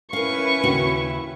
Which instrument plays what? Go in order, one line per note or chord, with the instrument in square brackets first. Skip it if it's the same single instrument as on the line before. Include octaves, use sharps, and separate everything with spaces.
[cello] C#4 B4 [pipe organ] E4 [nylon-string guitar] A#4 F5 [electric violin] C#6
[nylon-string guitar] D#2 C#3 F#4